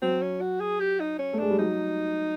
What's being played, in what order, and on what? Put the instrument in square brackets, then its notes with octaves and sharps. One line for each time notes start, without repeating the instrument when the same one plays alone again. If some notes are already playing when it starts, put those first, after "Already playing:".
[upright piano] F#3 [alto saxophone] C4
[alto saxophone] C#4
F#4
G#4
G4
D#4
C#4
[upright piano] A3
[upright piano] G#3 [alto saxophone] D4
[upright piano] G3
[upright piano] F#3 [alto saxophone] D#4